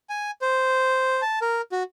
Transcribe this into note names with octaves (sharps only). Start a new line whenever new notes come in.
G#5
C5
A5
A#4
F#4